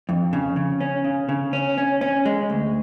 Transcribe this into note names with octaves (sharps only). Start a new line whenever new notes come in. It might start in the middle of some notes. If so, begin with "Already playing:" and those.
F2
C#3
C#3
C#4
C#3
C#3
C#4
C#4
C#4
G#3
D2